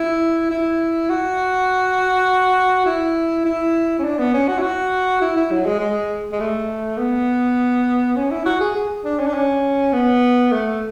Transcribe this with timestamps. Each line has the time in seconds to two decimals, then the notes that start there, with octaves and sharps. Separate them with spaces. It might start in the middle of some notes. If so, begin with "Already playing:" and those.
Already playing: E4
0.51 E4
1.10 F#4
2.86 E4
3.45 E4
3.99 C#4
4.04 D4
4.19 B3
4.34 C#4
4.48 F#4
4.58 E4
4.62 F#4
5.21 E4
5.36 E4
5.51 F#3
5.66 G#3
5.80 G#3
6.32 G#3
6.40 A3
6.98 B3
8.16 C#4
8.31 E4
8.46 F#4
8.60 G#4
8.75 G#4
9.05 D4
9.20 C#4
9.27 D4
9.34 C#4
9.93 B3
10.52 A3